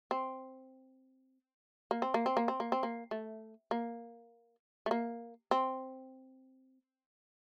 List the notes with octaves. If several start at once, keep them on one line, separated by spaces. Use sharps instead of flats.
C4
A#3
C4
A#3
C4
A#3
C4
A#3
C4
A#3
A3
A#3
A3
A#3
C4